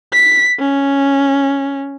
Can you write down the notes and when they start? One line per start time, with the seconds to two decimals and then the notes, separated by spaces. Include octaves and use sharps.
0.13 B6
0.60 C#4